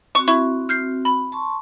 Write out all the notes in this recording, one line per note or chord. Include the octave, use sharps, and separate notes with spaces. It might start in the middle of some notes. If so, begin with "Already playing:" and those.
C4 F#4 C#6
E4 C#6
F6 G6 C7
B5
A5 C6 C#6